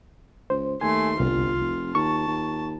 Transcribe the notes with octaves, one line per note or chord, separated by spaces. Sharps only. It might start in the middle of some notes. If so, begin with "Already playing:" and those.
C#2 C5
D#2 A3 G#5 C6
G1 C2 F4
F1
D#2 A5 C#6
D#2